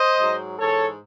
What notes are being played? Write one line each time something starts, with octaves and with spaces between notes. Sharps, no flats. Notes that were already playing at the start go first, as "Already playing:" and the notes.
Already playing: C5 D#5
G#2 F#3
G#2 E3 A4 C#5